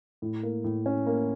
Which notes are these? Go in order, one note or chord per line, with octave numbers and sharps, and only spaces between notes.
A2
A#3
A2
C#4
A#3